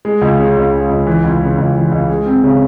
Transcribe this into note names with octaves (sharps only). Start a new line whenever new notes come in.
G#3
C#2
C#3
C#2
G#3
C#2
E3
C#2
C#3
C#2
E3
C#2
G#3
C4
C#3